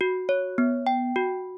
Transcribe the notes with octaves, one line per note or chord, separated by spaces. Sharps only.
F#4
C#5
B3
G5
F#4